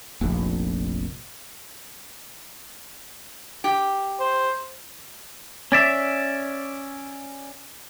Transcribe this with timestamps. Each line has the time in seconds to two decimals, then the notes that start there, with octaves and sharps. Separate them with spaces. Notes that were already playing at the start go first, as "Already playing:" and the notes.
0.21 F1 A#1
3.64 G4
4.20 C5
5.72 C#4 D5 E5